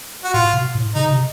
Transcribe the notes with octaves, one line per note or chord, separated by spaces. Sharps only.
F#4
A2 F4
B2
A2
C#3 D#4
C3